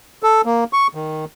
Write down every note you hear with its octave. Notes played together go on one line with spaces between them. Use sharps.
A4
A#3
C#6
D#3